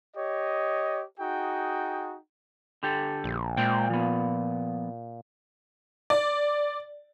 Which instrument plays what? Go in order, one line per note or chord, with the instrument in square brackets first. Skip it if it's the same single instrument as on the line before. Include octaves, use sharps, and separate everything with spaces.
[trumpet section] G4 C#5 D#5
D#4 F#4 G#4 G5
[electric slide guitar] D3 G4 A4
[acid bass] A#1
[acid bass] A#2 [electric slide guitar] G#3 C5 G5
[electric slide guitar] F3 B3
[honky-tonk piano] D5